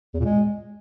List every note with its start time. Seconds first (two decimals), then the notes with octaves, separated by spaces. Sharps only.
0.14 E2
0.20 A#2
0.25 G#3